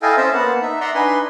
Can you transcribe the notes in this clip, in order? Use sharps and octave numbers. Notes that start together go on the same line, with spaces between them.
E4 A4 D#5 F5 G5 G#5
C4 C#4 C5 D#5 E5 A5
A#3 B3 F#5 A5
D#4 E5
D5 E5 F#5 A#5 C6
D4 D#4 B4 G#5 C6